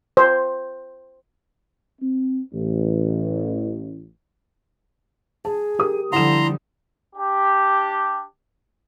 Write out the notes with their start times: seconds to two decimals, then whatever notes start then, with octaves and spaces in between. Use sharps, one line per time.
0.17 C5
2.01 C4
2.53 A1
5.45 G#4 A5
5.79 G4 A#4 D#6
6.13 D3 F3 G3 E4 F#5 A#5 C6 E7
7.15 D4 G4